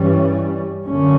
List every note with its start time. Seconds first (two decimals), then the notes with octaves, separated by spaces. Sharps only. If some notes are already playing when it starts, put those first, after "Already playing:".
Already playing: G2 E3 G3 C#4
0.84 F#2 D3 A3 C#4